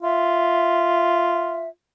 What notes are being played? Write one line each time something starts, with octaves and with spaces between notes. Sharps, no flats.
F4 E5